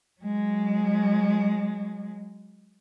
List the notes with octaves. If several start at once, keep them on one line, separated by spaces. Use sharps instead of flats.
F#3 G#3